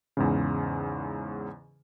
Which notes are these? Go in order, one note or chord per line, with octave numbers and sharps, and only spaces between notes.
E2 G#2 C#3